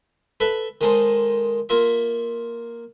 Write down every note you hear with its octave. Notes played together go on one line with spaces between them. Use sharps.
A4 B4 E5
D#3 G#3 D#4 A4 C5
A#3 F4 E5